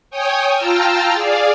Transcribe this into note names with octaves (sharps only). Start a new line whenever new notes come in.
C#5 G5 G#5 D#6
F4 G5 A5 A#5 E6 F6
G#4 D5 F5